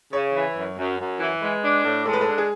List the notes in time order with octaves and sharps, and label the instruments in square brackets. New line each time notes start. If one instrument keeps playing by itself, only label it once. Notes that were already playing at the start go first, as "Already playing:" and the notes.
[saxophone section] C#3 [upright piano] C#5
[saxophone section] E3
F#2
F#2
F#2
E3
[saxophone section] G#3 [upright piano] B4
[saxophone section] D4
A2
[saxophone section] G#3 [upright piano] A4
[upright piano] B4
A4
[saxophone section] D4
[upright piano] G#4